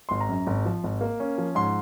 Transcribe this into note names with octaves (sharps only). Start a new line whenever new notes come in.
G#1 C6
A#5
F#2
G#1
F3
G#1
A#3
C#4
F3
G#2 C6